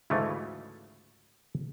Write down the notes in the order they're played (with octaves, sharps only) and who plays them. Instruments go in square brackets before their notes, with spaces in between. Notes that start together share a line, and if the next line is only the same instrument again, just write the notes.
[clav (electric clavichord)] D2 G#2 C#3 E3 F3 A3